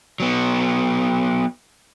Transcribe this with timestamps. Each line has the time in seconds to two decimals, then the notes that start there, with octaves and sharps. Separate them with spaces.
0.20 F#3 B3